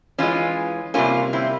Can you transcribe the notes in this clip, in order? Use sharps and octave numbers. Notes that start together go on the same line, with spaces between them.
E3 G#3 C#4 F4
C3 G3 A#3 C#4 F4
C4 E4